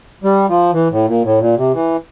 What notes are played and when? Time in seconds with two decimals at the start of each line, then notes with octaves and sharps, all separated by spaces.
0.24 G3
0.49 F3
0.73 E3
0.91 A2
1.08 A#2
1.24 A2
1.40 A#2
1.57 C3
1.74 E3